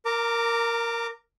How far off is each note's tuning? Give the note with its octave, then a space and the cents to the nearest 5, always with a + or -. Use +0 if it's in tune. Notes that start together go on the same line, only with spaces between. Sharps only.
A#4 +0 A#5 -30 D6 +0